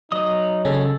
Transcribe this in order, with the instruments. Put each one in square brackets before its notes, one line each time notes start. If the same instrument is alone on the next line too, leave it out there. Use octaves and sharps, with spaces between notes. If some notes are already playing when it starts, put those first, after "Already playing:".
[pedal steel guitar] F#3 D#5 D#6 [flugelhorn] D#4
[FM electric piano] C#3 C#4 [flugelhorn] A4